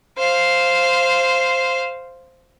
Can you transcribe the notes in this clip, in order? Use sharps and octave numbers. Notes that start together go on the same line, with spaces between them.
C5 F5